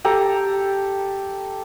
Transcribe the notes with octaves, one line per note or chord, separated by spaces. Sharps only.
G4 A4 A#5